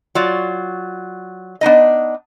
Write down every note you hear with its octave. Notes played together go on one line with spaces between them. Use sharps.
F#3 F4 D5
B3 D4 D#4 D#5